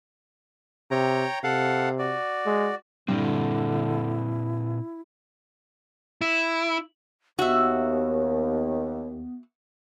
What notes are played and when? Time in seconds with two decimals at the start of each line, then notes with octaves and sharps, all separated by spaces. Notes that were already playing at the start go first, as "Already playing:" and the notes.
0.91 C3 C#5 G5 A#5
1.43 C3 A4 F5 F#5
1.99 F#4 D5
2.46 G#3
3.08 G2 A#2 D3 C4 E4
6.21 E4
7.39 D#2 B3 F#4 E5